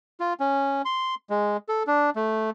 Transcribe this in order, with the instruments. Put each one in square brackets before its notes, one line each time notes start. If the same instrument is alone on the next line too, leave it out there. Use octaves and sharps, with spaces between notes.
[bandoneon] F4
C#4
C6
G#3
A4
D4
A3